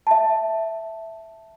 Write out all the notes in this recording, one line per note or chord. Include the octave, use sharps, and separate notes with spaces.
E5 A5